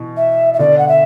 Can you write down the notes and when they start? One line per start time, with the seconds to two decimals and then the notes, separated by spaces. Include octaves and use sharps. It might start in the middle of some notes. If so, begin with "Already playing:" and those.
Already playing: B2 E3
0.17 E5
0.54 E5
0.59 B2 D3 D5
0.78 F#5
0.89 E5